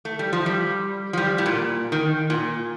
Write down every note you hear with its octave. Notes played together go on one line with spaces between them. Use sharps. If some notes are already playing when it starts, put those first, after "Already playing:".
A3
G3
F3
G3
F3
G3
A2
A#2
D#3
A#2